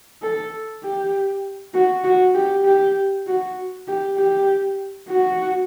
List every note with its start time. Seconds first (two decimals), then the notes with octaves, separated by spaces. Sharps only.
0.22 A4
0.83 G4
1.74 F#4
2.04 F#4
2.34 G4
2.65 G4
3.27 F#4
3.88 G4
4.17 G4
5.09 F#4